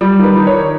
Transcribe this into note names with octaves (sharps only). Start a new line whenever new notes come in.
G3
D#3
B4
D#3
C#5
D#3